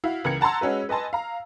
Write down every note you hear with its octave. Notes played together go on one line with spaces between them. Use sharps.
E4 F#4 F5
C#2 E3 A#4 G#6 C#7
F#5 A5 A#5 C6 E6
G#3 C#4 F#4 B4
B4 D#5 G#5 A5 C6
F5 A#5